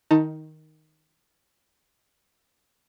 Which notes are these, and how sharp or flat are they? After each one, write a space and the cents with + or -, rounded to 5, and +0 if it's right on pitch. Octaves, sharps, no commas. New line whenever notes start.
D#3 +0 D#4 +20 A5 +30